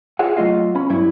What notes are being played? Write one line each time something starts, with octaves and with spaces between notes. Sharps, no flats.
F4 G#4 C#5 E5 F#5
F#3 A3 F4 D#5 F5
C#4 B5
G2 F#3 E4